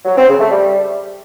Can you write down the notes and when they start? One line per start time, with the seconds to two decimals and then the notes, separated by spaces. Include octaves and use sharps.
0.05 F#3
0.16 C4
0.28 C#3
0.39 A3
0.51 G3